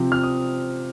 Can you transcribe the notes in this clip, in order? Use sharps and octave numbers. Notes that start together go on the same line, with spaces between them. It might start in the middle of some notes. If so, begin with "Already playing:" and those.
Already playing: C3 F3 C4
F6
D#6